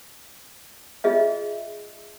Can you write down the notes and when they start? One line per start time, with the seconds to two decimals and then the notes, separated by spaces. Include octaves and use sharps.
1.04 F4 G#4 D#5 E5